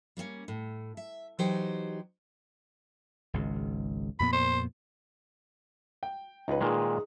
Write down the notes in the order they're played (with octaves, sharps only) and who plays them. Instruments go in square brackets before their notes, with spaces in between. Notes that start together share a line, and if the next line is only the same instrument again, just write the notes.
[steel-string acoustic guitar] G3 A#3 C4 C#4
A2
E5
E3 F#3 D#4 G4 C5 G5
[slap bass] G#1 C#2
[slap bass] F2 A#2 B3 [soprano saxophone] B5
[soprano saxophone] C5
[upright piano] G5
[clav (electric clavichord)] C#2 [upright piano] D#4 B4
[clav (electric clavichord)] A#2 D#3 G#3 [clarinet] G#4